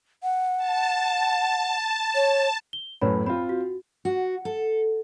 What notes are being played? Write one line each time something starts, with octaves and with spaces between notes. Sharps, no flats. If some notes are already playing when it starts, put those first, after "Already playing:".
F#5
A5
C#5
G7
F#2 A2 C#4 B4 C#5 B5
C4 F4 B5
F#4
F#4
A4